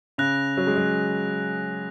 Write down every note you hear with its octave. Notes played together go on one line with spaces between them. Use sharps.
C#3 F#6 A#6 F7
F#3
G#3
F#3